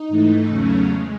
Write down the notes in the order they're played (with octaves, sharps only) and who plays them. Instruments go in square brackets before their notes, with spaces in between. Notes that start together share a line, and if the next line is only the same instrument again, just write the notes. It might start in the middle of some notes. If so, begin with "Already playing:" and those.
Already playing: [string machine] D#4
G#2 E3 A3
E2 C#3 F#3 A3 C#4
G#3